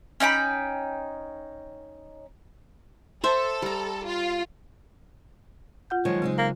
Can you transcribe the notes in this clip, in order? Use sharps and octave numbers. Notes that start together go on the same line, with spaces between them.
C#4 D#4 G5 B5
A4 C5 E5
G3 A#5
F4
F4 F#5 G6
D#3 F3 F#3 G#3 C#5
C#3 G#3 C4 D#4
A#3